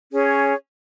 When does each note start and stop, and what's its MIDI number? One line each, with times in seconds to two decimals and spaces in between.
0.12 0.54 61
0.12 0.54 68
0.12 0.54 73